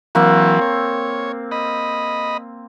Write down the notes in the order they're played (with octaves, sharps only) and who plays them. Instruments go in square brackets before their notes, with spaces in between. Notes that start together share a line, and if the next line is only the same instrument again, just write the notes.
[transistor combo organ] E3 F#3 [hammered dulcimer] A#3 C4
[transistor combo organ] C#5
D#5 B5